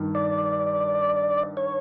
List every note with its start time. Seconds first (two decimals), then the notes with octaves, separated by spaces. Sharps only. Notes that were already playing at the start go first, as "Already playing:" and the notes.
Already playing: G2 D#3
0.15 D5
1.57 C#5